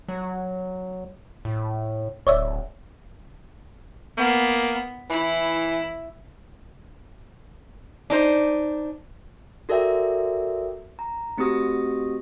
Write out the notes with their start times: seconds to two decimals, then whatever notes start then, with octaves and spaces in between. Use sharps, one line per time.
0.09 F#3
1.45 A2
2.27 D1 C#5 D5 E5
4.18 A#3 B3
5.10 E3 E4
8.10 D4 D#4 C5
9.69 F#4 A4 A#4 D5 E5 G5
10.99 A#5
11.37 A3 C4 F#4 G4 D#6 A#6